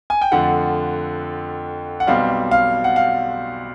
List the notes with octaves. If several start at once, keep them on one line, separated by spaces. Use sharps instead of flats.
G#5
G5
F2 D3 F3 A3 F#5
F#5
B1 B2 G3 C4 F5
F5
F#5
F5